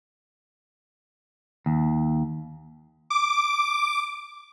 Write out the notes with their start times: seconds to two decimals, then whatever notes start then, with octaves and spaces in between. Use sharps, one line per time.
1.66 D#2
3.10 D6